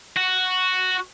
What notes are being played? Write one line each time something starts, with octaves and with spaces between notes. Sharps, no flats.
F#4